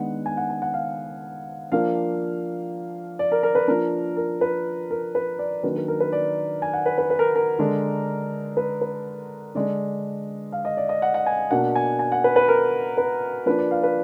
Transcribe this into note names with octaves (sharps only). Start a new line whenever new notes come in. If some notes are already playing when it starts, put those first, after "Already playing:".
Already playing: D#3 G#3 B3 D4 F#5
G#5
F#5
G#5
F#5
F5
F3 A#3 D4 F5
D5
A#4
A#4
B4
F3 A#3 D4 A#4
A#4
B4
A#4
B4
D5
D#3 F#3 A#3 D4 B4
A#4
A#4
B4
D5
G#5
F#5
B4
B4
B4
A#4
A#4
D3 G#3 D4
B4
B4
D3 G#3 D4 D5
F5
D#5
D5
D#5
F#5
F#5
G#5
B2 A#3 D4 F#5
G#5
G#5
F#5
B4
B4
A#4
B4
F3 A#3 D4 B4
D5
F5
B4